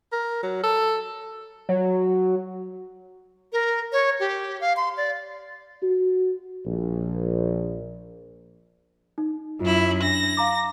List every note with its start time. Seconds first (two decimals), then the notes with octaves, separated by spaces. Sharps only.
0.12 A#4
0.43 F#3
0.63 A4
1.69 F#3
3.53 A#4
3.92 C#5
4.20 G4
4.61 F5
4.77 C6
4.97 D5
5.83 F#4
6.66 A#1
9.18 D#4
9.60 F#2 E4 F4
10.03 D4 A#6
10.37 F5 A#5 D6